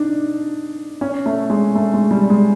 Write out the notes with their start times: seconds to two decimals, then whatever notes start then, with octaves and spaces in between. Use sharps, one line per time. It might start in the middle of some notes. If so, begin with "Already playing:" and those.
Already playing: D4 D#4
1.01 C#4
1.26 A3
1.50 G#3
1.75 A3
1.94 G#3
2.11 G3
2.30 G#3